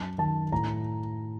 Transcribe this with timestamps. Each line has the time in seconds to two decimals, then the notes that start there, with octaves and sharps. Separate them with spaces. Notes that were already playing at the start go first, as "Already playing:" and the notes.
Already playing: F#2 A5
0.18 D#3 A5
0.52 A2 A#5